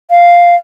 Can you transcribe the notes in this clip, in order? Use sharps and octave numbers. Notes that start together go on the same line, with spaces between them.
F5